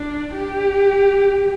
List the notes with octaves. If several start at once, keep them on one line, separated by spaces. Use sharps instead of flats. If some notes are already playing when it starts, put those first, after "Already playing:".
Already playing: D4
G4